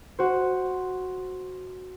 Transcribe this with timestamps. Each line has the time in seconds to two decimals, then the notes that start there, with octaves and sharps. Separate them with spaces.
0.19 F#4 C5